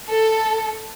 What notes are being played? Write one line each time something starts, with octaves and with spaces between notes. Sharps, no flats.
A4